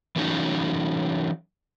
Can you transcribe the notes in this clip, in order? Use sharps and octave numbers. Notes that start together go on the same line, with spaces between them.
E3 F#3 C#4 D#4